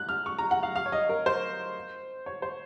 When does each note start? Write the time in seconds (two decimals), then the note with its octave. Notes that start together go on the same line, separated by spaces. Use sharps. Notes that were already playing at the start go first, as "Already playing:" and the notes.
Already playing: F#6
0.09 F6
0.26 C#6
0.38 A#5
0.51 F#5
0.63 F5
0.76 F5
0.86 C#5
0.92 D#5
1.09 A#4
1.26 C5
2.26 C#5
2.42 C5